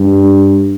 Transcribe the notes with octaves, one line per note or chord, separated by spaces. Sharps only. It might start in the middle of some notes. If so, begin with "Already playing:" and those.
Already playing: G2